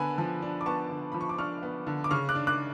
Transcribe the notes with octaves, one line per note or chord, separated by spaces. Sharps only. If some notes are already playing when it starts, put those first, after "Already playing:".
Already playing: D3 B3 D4 G#5 B5
F3
D4
D6
B3 A5 C#6
D3
F3 B5
C#6
D6
D4 C#6 F6
B3
D3
D6
C#3 C#6 F6
D6 F#6
D4
D6 F#6